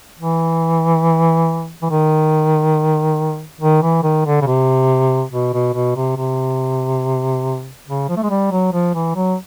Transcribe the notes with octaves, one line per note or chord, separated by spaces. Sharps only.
E3
E3
D#3
D#3
E3
D#3
D3
C#3
C3
B2
B2
B2
C3
C3
C#3
F3
A3
G#3
G3
F#3
F3
E3
F#3